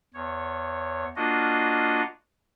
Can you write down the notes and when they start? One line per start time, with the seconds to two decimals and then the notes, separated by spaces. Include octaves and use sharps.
0.14 E2 C#5
1.16 A#3 D4 F4 F#4 D#5